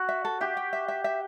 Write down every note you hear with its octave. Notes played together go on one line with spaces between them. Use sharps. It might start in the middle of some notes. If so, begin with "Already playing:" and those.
Already playing: F#4
E5
A4
G4 E5
G5
E5
E5
E5